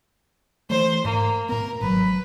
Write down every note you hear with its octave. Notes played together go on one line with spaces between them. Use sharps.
E3 A3 C5
G#2 A#3
A2 B3 A#4
G#1 D#3 F#3 B4